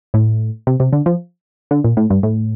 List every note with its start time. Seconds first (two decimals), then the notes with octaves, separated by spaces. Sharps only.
0.14 A2
0.67 C3
0.80 C3
0.93 D3
1.06 F3
1.71 D3
1.84 A#2
1.97 A2
2.10 G2
2.23 A2